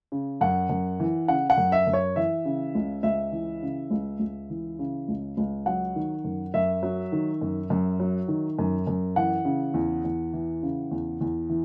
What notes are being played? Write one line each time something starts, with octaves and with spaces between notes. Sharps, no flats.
C#3
F#2 F#5
F#2
E3
C#3 F#5
F#5
F#2
E5
F#2
C#5
E3 E5
C#3
C#2
C#2 E5
E3
C#3
C#2
C#2
E3
C#3
C#2
C#2
F#3 F#5
D#3
F#2
F#2 E5
F#3
D#3
F#2
F#2
F#3
D#3
F#2
F#2
E3 F#5
C#3
E2
E2
E3
C#3
E2
E2
E3